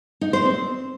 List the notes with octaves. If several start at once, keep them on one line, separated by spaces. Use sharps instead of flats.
D#4
C5
C4